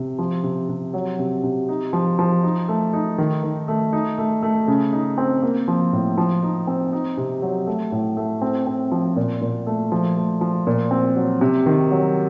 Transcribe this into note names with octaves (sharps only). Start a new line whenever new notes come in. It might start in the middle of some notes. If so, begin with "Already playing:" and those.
Already playing: C3
F3
C3
C3
F#3
C3
C3
D#4
F3
F3
D#4
A3
D#4
D#3
D#3
A3
D#4
A3
A3
C#3
D#4
C4
A#3
F3
A2
F3
D#4
C4
D#4
C3
F#3
A3
A2
A3
C4
C4
F3
A#2
A#2
A3
F3
A3
F3
A#2
C4
F#3
C3
D#3
F#3